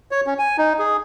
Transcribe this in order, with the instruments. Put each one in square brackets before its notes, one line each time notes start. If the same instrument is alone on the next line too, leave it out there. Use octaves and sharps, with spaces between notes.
[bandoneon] C#5
C#4
G#5
D#4
G#4